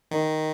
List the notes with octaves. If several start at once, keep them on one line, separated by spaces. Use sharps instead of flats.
D#3